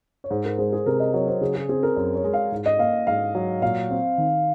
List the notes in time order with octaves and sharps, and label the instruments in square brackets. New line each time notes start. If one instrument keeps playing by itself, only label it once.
[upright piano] C#5
[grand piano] G#2 [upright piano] C5
[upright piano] A#4
[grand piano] G#3 [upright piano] C5
[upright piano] G#4
[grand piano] C3 [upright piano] A#4
[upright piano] D#5
[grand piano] F#3 [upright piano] C#5
[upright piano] C5
[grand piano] C#3 [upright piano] G#4
[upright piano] G#4
[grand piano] C4 [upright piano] G#4
[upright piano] A#4
[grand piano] F#2
[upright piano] C#5
[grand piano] G#3
[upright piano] F5
[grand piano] G#2
[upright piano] D#5
[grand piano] A#3 [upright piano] F5
[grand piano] G#2 [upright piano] F5
[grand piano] F#3
[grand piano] A#2 [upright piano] F5
[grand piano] C4
D#3